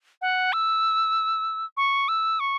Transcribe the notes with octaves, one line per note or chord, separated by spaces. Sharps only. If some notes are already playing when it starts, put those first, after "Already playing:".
F#5
E6
C#6
E6
C#6